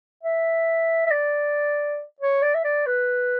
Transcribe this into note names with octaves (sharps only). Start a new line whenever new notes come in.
E5
E5
D5
C#5
D5
E5
D5
B4